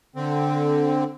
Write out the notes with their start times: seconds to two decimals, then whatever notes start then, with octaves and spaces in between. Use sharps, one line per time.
0.16 D3 C4